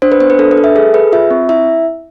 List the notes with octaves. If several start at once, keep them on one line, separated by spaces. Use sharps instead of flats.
D4 C5
B4
B3 C5
B4
D4 A4
B4
A4
E5
G#4 A4
G#4 B4
F4 E5
C4
E4 E5